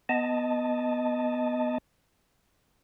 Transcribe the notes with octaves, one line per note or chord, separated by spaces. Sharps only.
B3 D#5 A5